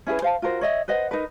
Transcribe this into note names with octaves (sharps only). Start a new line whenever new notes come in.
C#4 E4 G#4 B4
C5 F5 A5
F4 F#4 A#4 C5
C#5 D#5 E5
B4 C5 D#5 F#5
D#4 A#4 B4